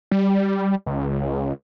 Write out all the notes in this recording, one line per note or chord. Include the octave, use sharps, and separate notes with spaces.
G3
C#2